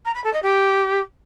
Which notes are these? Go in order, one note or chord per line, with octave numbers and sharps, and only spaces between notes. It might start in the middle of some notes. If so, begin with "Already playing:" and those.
A#5
B5
A4
D#5
G4